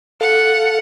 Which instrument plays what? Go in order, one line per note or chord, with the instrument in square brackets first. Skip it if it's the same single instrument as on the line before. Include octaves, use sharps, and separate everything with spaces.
[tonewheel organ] A4 F5 [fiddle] F#5